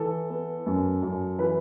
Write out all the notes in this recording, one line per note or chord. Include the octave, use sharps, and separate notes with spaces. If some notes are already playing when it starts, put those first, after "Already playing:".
Already playing: E3 A4
B3
F#2
F#2
E3 B4